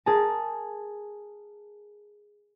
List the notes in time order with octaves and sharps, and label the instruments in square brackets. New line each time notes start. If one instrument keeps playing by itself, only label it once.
[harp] G#4 A#4 A5